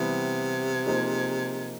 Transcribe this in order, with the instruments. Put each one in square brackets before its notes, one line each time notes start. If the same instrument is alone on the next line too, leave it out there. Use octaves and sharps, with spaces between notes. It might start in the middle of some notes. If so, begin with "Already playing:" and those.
Already playing: [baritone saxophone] C3 [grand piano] E3 G3 B3 E4
[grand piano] F3 A#3 D#4 G#4 C5